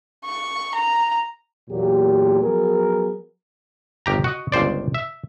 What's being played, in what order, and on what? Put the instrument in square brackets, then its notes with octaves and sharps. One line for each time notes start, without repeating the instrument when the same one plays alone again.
[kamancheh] C#6
A#5
[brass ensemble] E2 A#2 F#3 G4
F3 F#3 B3 G#4 A#4
[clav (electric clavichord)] G1 G4 A#5
F#4 D#5
G1 C#2 C5 D5
E5